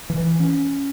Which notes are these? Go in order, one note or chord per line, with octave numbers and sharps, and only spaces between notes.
E3
C#4